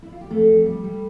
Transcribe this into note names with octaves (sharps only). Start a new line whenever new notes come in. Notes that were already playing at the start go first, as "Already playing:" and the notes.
E4
F4
G4
F2 A3 A4
F2
G3
G3